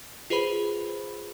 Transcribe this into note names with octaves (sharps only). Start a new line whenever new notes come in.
F4 G#4 B4 C5 B5